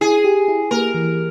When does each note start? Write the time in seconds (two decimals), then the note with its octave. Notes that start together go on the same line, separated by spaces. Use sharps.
0.01 E4 G#4
0.24 G4
0.48 E4
0.71 A#3 A#4
0.94 E3